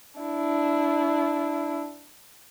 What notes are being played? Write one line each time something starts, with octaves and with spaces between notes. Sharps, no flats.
D4 E4